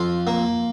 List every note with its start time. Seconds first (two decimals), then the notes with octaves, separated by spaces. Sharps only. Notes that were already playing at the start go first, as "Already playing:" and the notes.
Already playing: F2 F4
0.27 A#3